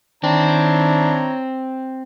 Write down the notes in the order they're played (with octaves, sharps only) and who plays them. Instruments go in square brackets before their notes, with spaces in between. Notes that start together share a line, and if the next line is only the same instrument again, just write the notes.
[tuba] D#3 [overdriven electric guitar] C4 [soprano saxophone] D4 [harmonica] E4 C#5 A#5